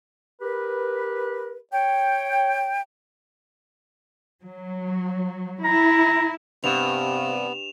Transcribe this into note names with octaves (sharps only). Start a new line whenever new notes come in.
G4 A#4 B4
C#5 G5
F#3
E4 A#5
G2 C3 B3 E7 F7